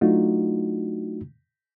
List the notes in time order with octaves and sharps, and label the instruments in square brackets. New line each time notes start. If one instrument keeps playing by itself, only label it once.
[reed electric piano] F#3 A3 D4 D#4 F4 F#4